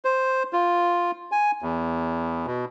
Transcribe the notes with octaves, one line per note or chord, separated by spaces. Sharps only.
C5
F4
G#5
E2
B2